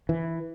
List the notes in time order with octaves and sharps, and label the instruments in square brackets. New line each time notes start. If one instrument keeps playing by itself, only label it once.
[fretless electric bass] E3